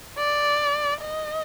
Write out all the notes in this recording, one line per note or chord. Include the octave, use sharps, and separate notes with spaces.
D5
D#5